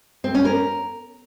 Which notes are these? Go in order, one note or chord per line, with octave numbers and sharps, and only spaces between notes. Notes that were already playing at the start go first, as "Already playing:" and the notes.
C4
C#4
A#4